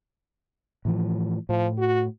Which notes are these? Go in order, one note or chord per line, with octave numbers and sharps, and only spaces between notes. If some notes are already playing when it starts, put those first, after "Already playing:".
A2 E3 F3
A2 F3
F#4